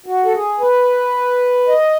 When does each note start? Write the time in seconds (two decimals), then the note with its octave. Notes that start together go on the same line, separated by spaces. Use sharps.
0.06 F#4
0.25 A4
0.34 G#4
0.60 B4
1.68 D#5